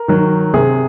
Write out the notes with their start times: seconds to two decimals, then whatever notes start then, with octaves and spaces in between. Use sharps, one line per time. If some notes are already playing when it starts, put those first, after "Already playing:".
Already playing: A#4
0.08 D#3 F#3
0.54 C3 G#4